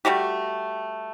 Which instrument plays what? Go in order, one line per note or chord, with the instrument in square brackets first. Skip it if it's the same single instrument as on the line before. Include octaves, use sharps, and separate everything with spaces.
[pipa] G3 A3 F#4 G4